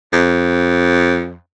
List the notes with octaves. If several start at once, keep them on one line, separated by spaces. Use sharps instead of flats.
F2